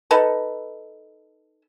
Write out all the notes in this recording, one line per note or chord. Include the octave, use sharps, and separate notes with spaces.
D#4 A4 B4